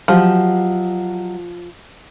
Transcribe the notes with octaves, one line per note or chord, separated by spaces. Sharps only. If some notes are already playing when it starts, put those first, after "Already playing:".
F3 F#3 G4 D#5